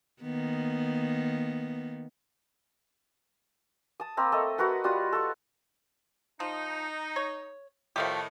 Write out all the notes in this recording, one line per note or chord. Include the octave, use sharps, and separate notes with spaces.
D#3 A#3 B3
A5 D#6
A#3 C4 A#4 B5
A3 A4 D#5
F#4 A#4 B4 F#5
G3 F4 F#4 D#6
A4 C#6
F3 D#4
C#5
A2 D#3 F3 A3 G4